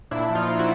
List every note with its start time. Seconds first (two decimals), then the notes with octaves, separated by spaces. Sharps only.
0.11 A#2 D4 E4
0.30 F3
0.35 D#4 F4
0.47 F3
0.59 E4 F#4